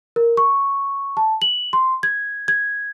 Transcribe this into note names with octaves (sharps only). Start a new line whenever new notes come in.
A#4
C#6
A5
F#7
C6
G#6
G#6